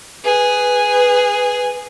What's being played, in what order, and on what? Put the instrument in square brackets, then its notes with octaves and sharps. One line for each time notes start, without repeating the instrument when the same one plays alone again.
[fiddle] G#4 [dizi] B4